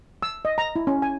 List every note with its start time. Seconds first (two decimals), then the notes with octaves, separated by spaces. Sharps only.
0.22 E6
0.45 D#5
0.58 A#5
0.76 E4
0.87 C#4
1.02 G#5